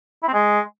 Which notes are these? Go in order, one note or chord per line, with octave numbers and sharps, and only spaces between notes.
E4
C4
G#3